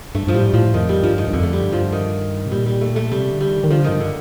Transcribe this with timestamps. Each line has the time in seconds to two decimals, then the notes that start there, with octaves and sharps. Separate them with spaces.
0.15 G2 A3
0.27 G2 F3
0.34 A2 G3
0.48 G2
0.53 A2 F3
0.74 F2 D#3
0.89 G3
1.03 G2 F3
1.18 D#3
1.28 G2
1.33 F2 D3
1.43 A3
1.53 G3
1.62 G2
1.72 F3
1.93 D#3
2.46 C3
2.52 A#2 G3
2.66 G3
2.81 A3
2.96 A3
3.11 C3 G3
3.31 D3
3.41 G3
3.50 D#3
3.64 D#3
3.70 D3 F3
3.84 G2 D#3
4.00 D3